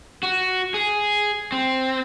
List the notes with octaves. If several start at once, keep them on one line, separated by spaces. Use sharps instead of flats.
F#4
G#4
C4